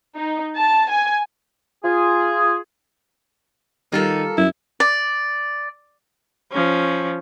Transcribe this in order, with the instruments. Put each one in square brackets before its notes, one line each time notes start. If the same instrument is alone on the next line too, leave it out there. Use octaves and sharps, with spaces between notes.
[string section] D#4
A5
G#5
[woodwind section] F4 G#4
[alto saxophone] D#3 [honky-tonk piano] G3 [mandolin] A#3 F4 A4
[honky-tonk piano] F#2 [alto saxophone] E4
[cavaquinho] D5
[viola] F3 C#4